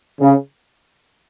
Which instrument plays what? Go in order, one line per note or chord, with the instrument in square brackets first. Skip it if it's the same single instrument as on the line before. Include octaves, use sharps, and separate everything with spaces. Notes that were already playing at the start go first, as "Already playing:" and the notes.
[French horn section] C#3